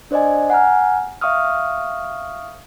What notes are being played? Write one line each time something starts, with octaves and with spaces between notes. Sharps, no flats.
D4 C5 D5 D#5 G#5
F#5 G#5 A#5 F6
E5 F5 C#6 D#6 F6